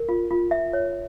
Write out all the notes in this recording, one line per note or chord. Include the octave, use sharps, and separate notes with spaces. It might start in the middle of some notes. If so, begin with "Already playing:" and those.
Already playing: A#4
F4
F4
E5
C#5